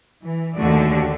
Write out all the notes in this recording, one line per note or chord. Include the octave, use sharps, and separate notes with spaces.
E3
D#2 D3 A3 F#4 D5